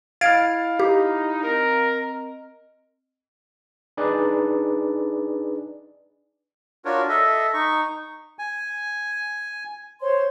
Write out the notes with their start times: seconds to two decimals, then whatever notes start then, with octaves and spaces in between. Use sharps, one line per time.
0.21 E4 D#5 F5 B5 F6 G#6 A6 D7
0.79 D#4 G4
1.43 C4 A#4 D#5
3.97 D4 D#4 G#4 B4 D5
6.85 D4 F4 F#4 A#4 C#5
7.09 A4 D#5 E5
7.54 D#4 C#6
8.39 G#5
10.01 C5 C#5 C6